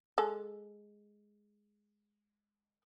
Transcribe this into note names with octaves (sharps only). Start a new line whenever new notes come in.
G#3 A4